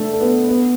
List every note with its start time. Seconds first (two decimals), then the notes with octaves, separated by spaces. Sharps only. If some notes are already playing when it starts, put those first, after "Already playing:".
Already playing: A3 D4 A4
0.13 A4
0.20 B3 B4
0.48 B3 B4